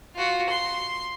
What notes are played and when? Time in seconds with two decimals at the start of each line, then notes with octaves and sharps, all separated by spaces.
0.15 F4 F#4
0.50 C6